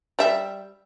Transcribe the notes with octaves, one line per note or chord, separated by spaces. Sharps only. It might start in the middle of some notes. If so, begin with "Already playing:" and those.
G3 E5